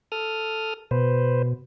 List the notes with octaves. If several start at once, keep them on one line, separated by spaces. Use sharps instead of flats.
A4 D#6 F6
B2 B4 C5